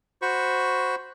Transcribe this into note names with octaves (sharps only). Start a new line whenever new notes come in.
F#4 C5 B5 C#6